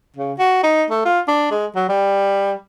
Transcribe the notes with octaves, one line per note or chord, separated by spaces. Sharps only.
C#3
F#4
D#4
A3
F4
D4
G#3
F#3
G3